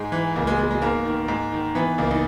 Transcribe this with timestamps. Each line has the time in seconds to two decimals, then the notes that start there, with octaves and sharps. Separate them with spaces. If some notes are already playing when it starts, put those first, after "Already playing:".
Already playing: G#2 G#3
0.12 E3
0.36 C#2 A#3
0.47 G#3
0.59 B2 G#3
0.71 G#3
0.82 G#2 A#3
1.05 D#3
1.28 G#2
1.52 D#3
1.75 E3 B3
1.98 C#2 A#3
2.11 D#4